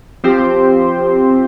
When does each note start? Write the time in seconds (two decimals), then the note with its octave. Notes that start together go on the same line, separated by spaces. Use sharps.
0.24 F3 C4 G4 C5